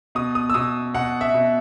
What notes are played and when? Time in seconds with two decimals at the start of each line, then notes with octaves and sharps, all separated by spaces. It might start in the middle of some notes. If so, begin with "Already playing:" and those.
0.15 B2 D#6
0.35 D#6
0.50 E6
0.54 B2 D#6
0.94 B2 F#5
1.21 E5
1.34 B2